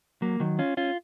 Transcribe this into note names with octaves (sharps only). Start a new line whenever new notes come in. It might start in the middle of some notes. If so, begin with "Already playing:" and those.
F#3 A#3
D#3 F#3
C#4 F4
C#4 F4